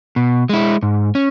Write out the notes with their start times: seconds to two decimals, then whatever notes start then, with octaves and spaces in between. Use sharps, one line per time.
0.16 B2
0.49 G#3 E4
0.83 G#2
1.15 C#4